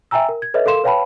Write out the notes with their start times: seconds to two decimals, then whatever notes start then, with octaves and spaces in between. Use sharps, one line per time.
0.11 E5 G5 G#5 A#5 E6
0.29 A#4
0.42 G#6
0.54 A4 B4 C#5 D#5 E5
0.66 A4 A#4 F5 C6 E7
0.84 B4 C#5 F5 G5 A5 B5